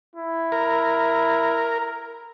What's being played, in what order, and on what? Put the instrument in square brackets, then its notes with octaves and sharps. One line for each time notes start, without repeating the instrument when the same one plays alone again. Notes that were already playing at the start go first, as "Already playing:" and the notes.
[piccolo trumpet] E4
[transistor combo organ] A#4